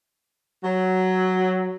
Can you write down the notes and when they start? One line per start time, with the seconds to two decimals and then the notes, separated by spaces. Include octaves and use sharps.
0.64 F#3